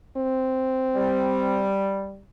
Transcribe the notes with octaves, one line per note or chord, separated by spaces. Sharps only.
C4
G3